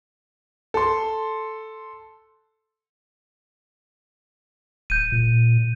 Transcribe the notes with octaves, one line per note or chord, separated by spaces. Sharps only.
A4 C6
D1 G6 D#7
A#2